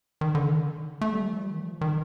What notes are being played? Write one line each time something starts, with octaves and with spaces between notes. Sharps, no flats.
D#3
D3
D#3
A3
G3
F3
G3
D#3
F3
D#3